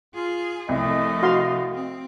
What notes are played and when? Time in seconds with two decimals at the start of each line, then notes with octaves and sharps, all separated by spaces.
0.14 F4 G#4
0.69 C2 F3 A3 D#5
1.23 F#4 F5 C6
1.74 C4